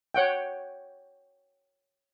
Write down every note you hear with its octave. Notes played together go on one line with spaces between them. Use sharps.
C#5 F#5 G5